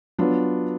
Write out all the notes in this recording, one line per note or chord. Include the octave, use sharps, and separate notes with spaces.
F#3 B3 D4 F4